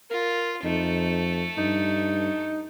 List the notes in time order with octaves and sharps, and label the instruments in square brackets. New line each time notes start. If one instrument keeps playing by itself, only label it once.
[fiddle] F4 [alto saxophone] A#4
[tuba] F2 [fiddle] A3 [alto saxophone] D#4
[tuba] G2 [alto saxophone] D#4